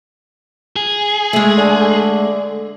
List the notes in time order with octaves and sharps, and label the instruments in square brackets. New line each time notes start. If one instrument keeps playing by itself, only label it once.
[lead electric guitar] G#4
[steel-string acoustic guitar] G#3 A3
[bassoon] D3